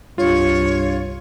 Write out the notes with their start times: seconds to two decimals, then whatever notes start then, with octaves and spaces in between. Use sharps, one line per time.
0.18 C2 G2 F4 C#5